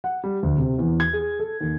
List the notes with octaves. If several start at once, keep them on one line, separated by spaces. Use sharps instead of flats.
F#5
G3
D2
C3
E2
G#6
G#4
A4
D#2